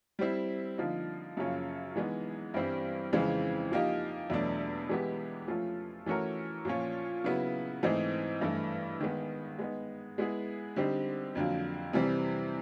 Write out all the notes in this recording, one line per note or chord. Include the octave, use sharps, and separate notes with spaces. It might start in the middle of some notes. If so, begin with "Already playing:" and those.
G3 C4 E4
D3 F3 A#3 D#4
F#2 C#3 F3 A#3 C#4
E3 G#3 B3 D#4
G2 E3 G3 C4 E4
F2 C#3 E3 G#3 C4
F3 A#3 D#4 G4
E2 B2 F#3 A3 D4
E3 G#3 B3 E4 G4
F3 A3 C#4 F4
E3 A3 C#4 F#4 A#4
A#2 F3 A#3 C#4
C#3 F#3 B3 E4
G#2 E3 A3 C4 D#4
G2 E3 A3
D#3 G#3 B3
G#3 B3 D#4
G#3 B3 E4 G#4
D3 G3 C4 D#4 G4
F2 D3 F#3 A#3
C3 E3 G3 C4